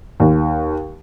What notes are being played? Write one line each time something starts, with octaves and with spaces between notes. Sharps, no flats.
D#2